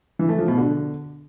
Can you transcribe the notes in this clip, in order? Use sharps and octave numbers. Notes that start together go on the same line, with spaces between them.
E3
A3
F3
B2
D3